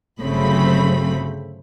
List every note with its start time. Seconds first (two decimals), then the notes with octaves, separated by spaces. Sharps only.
0.21 G1 C#3 F#3 A3 C4 B5